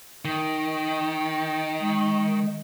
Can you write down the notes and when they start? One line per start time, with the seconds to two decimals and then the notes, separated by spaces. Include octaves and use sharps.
0.25 D#3
1.80 G#3